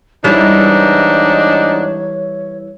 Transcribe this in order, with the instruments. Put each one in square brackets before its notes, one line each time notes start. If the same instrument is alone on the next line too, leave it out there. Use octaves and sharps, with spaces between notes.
[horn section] G#2 D4 D#4 [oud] E3 G3 [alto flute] C#5